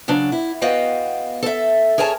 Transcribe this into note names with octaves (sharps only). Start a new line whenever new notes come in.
C#3 F#3 D4
E4
B3 F#4 D#5 F5 G5
A4 E5
G#4 A#4 C#5 G#5 A5